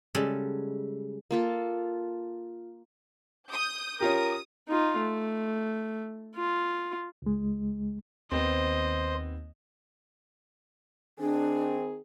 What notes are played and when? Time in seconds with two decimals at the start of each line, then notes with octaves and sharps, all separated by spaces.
0.15 C#3 G3 G#3 A4 E5 G#5
1.31 A#3 F4 A4
3.51 D#6 G6
4.00 C#4 F4 G4 A#4 D#6
4.68 D#4 F4
4.97 A3
6.35 F4
7.22 C#2 G#3
8.31 D#2 B3 C4 C5 D#5
11.19 D#3 C4 D4 G#4